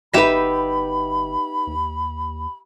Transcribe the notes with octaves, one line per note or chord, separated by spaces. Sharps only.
G1 B3 D#4 G4 B4 E5 B5 B6
D#2